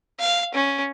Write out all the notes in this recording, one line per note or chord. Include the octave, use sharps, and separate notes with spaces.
F5
C#4